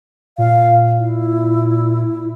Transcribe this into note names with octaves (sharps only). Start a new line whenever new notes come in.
A#2 F5
E4